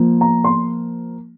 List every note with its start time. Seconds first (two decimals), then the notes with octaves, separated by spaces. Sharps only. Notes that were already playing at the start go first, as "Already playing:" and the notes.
Already playing: F3 A#3
0.21 A#5
0.44 C6